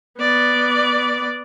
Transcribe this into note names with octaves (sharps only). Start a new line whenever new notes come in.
B3 D5